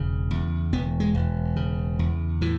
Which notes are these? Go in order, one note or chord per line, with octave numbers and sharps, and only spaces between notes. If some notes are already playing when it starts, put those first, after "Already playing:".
Already playing: E1 C#3
E2
E1 B3
G#3
E1
C#3
E2
A2 E3